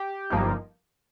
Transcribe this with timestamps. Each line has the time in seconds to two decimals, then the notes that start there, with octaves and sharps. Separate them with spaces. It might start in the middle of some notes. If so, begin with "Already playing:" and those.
Already playing: G4
0.30 G1 G2 F3 A#3 D#4